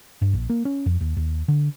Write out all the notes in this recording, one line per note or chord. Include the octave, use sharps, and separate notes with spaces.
G2
A#1
A#3
C#4
F2
D#2
D#2
D3